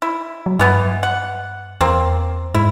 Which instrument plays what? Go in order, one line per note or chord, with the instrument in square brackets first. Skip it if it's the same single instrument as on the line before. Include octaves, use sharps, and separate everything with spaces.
[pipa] E4
[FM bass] F#3
[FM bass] G2 [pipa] E3 B3 E4
[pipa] F#5
[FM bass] E2 [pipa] A#3 C4
[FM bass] G#2 [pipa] E4